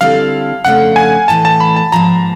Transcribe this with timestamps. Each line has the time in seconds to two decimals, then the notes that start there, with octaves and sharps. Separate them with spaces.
0.01 D3 G3 C4 E4 A4 F5
0.64 F2 C#3 F3 A3 D4 F#5
0.96 G#5
1.28 A2 E3 A3 A5
1.45 A5
1.60 B5
1.76 A5
1.92 G#2 F3 A#3 A#5